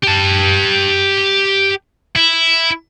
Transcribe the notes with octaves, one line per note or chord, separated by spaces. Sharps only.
G4 A5
E4